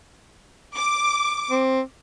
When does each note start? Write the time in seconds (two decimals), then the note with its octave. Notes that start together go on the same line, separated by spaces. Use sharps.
0.77 D6
1.51 C4